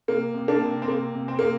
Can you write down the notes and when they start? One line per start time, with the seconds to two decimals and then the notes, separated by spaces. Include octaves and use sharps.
0.08 C3 A#3
0.34 C3
0.48 A#3 D4
0.62 C3
0.82 C4
0.88 C3 A#3
1.15 C3
1.28 C4
1.39 C3 A#3